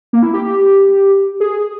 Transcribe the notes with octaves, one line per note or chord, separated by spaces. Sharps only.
A#3
E4
G4
G4
G#4